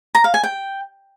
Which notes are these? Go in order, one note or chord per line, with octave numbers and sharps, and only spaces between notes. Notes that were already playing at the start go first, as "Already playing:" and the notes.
A#5
F5
G#5
G5